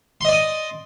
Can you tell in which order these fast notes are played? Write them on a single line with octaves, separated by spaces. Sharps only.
C6 D#5 D5 D#6